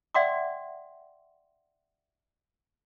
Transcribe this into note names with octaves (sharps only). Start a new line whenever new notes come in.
D5 E5 F#5 G5 C6 D6